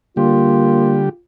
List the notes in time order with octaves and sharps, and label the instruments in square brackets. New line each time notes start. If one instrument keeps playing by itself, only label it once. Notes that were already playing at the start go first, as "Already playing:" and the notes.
[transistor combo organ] D3 G3 G4 [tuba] A#3 [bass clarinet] F4